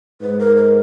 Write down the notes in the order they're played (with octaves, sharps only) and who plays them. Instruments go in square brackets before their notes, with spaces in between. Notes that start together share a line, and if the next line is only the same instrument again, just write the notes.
[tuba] G#2 [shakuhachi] B4
[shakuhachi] A#4
A#4